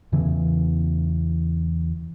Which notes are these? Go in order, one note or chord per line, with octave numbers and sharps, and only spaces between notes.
E2 C#3 E3